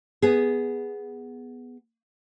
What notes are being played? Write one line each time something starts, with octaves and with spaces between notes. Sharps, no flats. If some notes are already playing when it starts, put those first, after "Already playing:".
B3 G#4